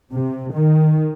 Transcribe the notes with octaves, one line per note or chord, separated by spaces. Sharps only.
C3
D#3